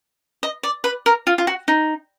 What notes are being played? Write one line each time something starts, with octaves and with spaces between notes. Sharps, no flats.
D#5
D5
B4
A#4
F4
F4
F#4
D#4